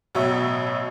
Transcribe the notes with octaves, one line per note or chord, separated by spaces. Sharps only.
A1 B2 F#3 C#5 E5